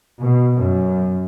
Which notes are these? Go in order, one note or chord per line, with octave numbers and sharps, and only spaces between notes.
B2
F#2